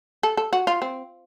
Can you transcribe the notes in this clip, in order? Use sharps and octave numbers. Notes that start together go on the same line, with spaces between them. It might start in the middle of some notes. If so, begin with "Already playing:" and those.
A4
A4
F#4
F4
C4